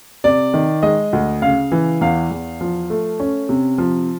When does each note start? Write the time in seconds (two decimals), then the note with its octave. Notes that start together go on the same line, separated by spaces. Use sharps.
0.24 C3 D5
0.54 D#3
0.83 G#3 D#5
1.13 D2
1.42 C#3 F5
1.72 E3
2.01 E2 F5
2.31 E2
2.61 F3
2.90 A3
3.20 C#4
3.49 C3
3.78 F3